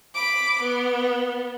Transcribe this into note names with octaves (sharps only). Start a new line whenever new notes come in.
B5 D6
B3